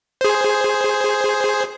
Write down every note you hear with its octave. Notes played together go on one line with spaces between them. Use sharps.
G#4 C5